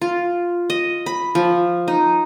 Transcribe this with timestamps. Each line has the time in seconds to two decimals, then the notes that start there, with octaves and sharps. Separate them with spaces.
0.01 F4
0.70 D#5
1.06 B5
1.35 F3
1.88 D#4